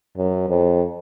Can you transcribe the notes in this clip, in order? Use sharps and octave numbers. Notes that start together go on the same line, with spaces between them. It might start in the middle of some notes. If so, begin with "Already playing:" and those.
F#2
F2